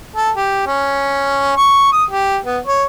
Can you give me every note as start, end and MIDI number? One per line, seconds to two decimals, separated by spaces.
0.16 0.30 69
0.37 0.63 67
0.67 1.56 61
1.57 1.90 85
1.93 2.04 87
2.10 2.38 67
2.45 2.59 59
2.66 2.85 73